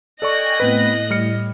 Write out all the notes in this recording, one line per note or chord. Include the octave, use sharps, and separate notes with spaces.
A4 D5 D#5 G5 G#5 C#6 F#6 A#6
A2 B3 C4 B4
G3 F6 C#7